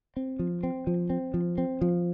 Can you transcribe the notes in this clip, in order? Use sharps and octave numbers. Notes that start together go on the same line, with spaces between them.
C4
F3
C4
F3
C4
F3
C4
F3